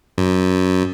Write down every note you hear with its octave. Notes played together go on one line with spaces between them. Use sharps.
F#2